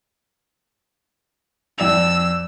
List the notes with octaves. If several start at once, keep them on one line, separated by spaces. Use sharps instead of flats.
F2 D5 E6 F7